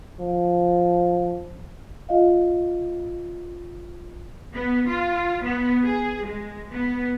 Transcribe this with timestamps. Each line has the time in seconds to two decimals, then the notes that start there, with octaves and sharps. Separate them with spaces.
0.20 F3
2.09 F4 D#5 F5
4.53 B3
4.88 F4
5.44 B3
5.85 G#4
6.26 G#3
6.72 B3